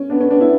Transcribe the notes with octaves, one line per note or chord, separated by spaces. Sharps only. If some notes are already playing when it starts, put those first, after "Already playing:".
Already playing: C#4
B3 D4
C#4
B3 D4
C#4 E4